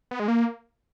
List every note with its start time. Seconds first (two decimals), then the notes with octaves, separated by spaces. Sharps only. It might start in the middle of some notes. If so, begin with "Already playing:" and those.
0.11 B3
0.20 G#3
0.28 A#3